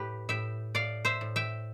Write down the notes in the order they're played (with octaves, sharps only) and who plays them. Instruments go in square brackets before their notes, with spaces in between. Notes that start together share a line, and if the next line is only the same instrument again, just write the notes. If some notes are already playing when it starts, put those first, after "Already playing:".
Already playing: [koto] A2 G4 B4
A2 E5 G5
A2 D5 F5
C5 E5
A2
E5 G5